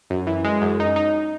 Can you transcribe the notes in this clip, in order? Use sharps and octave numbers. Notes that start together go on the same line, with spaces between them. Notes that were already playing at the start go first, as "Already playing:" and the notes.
F#2
E3
G#3
F#2
D#4
D#4